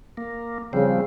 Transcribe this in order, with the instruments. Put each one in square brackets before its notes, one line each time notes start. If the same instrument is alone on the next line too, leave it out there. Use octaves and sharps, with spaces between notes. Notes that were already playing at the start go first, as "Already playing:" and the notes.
[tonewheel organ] A#3
[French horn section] C#3 [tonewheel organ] F3 G3 C4